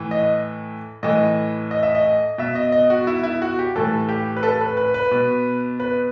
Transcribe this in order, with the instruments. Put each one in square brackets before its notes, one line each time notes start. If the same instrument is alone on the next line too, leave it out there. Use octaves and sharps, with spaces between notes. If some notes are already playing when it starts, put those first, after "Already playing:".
Already playing: [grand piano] A2 E3
D#5
A2 E3 D#5
D#5
E5
D#5
B2 E5
D#5
D#5
F#4
E4
E4
F#4
G4
A2 E3 A4
G4
B4
A4
B4
B4
B4
B2
B4